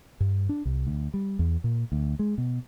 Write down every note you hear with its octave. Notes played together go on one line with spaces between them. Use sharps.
G2
D4
C2
D2
G3
E2
A#2
D2
G#3
B2